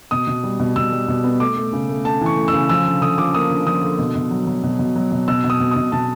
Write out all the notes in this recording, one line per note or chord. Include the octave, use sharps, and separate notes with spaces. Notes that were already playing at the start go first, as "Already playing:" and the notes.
B2 D#6
B2
G3
B2
B2 E6
G3
B2
B3
A3 D6
A3
C#3
A3
A3 A5
E3
C#6
A3
E6
C#3
F3 E6
D3
D3 D#6
F3 D6
A#3 D#6
D3
F3 D#6
D3
B2
B2
F#3
F#3
B2
B2
F#3
B2
B2 E6
B2
D#6
B2
B2 D#6
B2 A5